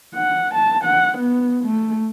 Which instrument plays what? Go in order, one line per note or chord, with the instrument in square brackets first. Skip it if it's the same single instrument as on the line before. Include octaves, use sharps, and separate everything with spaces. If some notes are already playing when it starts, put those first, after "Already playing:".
[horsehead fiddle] F#5
A5
F#5
B3
A3